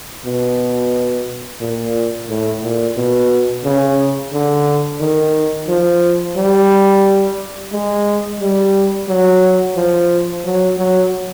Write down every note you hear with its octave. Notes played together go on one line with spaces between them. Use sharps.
B2
A#2
A2
A#2
B2
C#3
D3
D#3
F3
G3
G#3
G3
F#3
F3
F#3
F#3